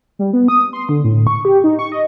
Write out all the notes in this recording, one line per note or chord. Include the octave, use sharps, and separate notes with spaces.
G3
B3
D#6
C6
D3
A2
C#6
G4
D#4
C#6
D#5